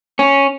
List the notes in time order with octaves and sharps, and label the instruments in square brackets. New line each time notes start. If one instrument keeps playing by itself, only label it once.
[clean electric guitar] C#4